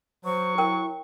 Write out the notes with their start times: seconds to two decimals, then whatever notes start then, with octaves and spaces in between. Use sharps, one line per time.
0.25 F#3 C5 C#6
0.58 E4 A#4 G5